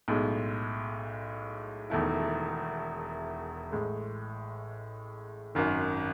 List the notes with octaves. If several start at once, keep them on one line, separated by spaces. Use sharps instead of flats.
B1 A2 G#3
E1 E2 D#3 A3 E4
A1 A2 G#3
G#1 F#2 D#3